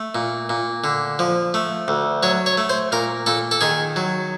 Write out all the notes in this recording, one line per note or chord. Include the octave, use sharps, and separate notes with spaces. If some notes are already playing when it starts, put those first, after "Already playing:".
Already playing: A3
A#2
A#2
D3
F3
A3
D2
F#3 C#5
C#5
A3
C5
A#2 A#4
A#2 A4
A4
D#3 G#4
F#3